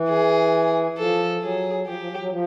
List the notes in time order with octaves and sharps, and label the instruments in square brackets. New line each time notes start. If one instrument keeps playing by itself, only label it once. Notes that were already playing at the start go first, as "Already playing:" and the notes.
Already playing: [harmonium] E3
[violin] G#4
[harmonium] F3 [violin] A4
[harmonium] F#3 [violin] G#4
[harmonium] F3 [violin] G4
[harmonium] F3
F#3
F#3
F3